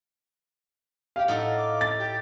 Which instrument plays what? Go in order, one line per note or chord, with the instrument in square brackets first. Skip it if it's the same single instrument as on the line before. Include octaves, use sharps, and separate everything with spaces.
[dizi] G4 [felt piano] F5
[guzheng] A2 D#4 A4 [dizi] F#5
[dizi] D6
[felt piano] A6
[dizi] G4